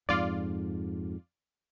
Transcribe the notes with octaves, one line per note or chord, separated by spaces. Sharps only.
F2 G#2 F4 D5